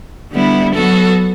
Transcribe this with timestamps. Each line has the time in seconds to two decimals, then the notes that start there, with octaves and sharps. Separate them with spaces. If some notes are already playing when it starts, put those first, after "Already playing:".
0.32 D3 G3 B3 E4
0.74 F#3 B3 F#4 A4